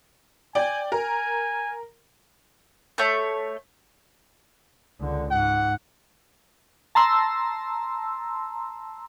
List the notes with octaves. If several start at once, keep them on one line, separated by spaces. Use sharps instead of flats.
D5 G5 G#5
A#4 G#5
A3 C#5 G6
C#2 D3
G#2 F#5
A5 A#5 C6 E6